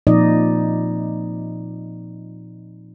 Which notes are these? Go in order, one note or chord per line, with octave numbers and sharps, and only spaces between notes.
A#2 F3 C4 D#4 D5 D#5